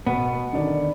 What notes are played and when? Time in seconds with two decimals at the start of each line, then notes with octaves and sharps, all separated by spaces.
0.06 B2 B3
0.53 D3 D#3 D5